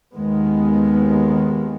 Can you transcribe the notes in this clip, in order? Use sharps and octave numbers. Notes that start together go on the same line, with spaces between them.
D#2 D#3 G#3 B3